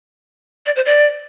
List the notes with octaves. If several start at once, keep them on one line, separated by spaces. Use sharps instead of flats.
D5
C5
D5